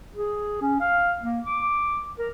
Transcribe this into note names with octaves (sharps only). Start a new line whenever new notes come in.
G#4
C#4
F5
A#3
D6
A#4